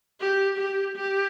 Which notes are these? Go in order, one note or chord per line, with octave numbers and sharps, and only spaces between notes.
G4
G4
G4